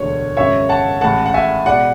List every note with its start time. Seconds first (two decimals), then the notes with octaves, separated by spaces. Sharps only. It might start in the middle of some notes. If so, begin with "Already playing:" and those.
Already playing: E1 D2 D3 G#3 C#5
0.37 G#1 F#2 C#3 G#3 C#5 E5
0.69 F#5 A5
1.01 A1 A2 G#3 F#5 A5
1.26 F#5
1.34 E5 G#5
1.66 B2 G#3 D5 F#5